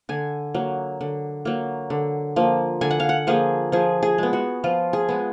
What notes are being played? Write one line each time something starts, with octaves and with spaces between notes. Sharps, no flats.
D3 G#5
F#3 A#3
D3
F#3 A#3
D3
F3 A#3
D3 G#5
F#5
F5
F#5
F3 A#3 G#4
F3 G#4
G#4
G#3 B3
F#4
F3 F4
G#4
G#3 B3